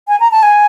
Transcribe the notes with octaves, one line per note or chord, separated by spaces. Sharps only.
G#5
A#5
A5
G#5